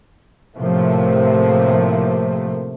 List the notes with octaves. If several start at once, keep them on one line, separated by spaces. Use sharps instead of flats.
A2 C3 F3 A3 A#3